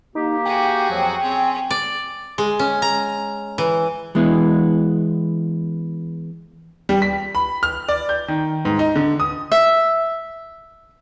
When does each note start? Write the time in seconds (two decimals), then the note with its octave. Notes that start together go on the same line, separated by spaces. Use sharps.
0.15 A#3 D#4 G4
0.46 F#4 G#4 G5
0.90 F2 F3 F#3
1.22 C4 C#4 G#4
1.70 D5
2.38 G#3
2.59 C#4
2.82 A#5
3.58 E3
4.15 E3 G#3 B3 E4
6.89 G3
7.02 B6
7.35 B5
7.63 F6
7.89 D5
8.09 G6
8.28 D#3
8.65 G#2
8.79 D#4
8.96 D3
9.20 D#6
9.52 E5